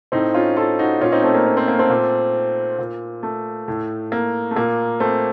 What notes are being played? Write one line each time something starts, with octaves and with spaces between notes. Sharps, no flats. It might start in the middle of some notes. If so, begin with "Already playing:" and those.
A2 C4 D#4
C#4 F4
F4 A4
D#4 F#4
A#2 C#4 F4
C4 D#4
A3 C4
A#3
C#4
C4
A#3
A3 C4
A#2
A#2
A3
A2
A#3
A3
A#2 A#3
A3 C4